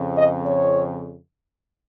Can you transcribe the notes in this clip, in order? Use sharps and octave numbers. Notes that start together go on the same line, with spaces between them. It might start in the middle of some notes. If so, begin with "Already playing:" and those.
Already playing: F2 C#3
D#5
C#5